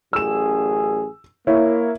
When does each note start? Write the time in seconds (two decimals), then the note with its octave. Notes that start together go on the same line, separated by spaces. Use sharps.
0.13 A1 F#2 G#4 E6 E7
1.47 A#3 E4 C#5